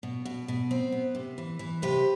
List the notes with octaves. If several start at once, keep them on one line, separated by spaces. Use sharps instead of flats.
B2
B2
B2
C4
B3
C3
E3
E3
C3 G4 B4